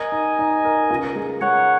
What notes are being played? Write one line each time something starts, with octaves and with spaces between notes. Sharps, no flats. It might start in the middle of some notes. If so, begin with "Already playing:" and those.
Already playing: A#4 D#5 G#5
D#4
D#4
A#4
C#2
G#3
G#3 C#5 F#5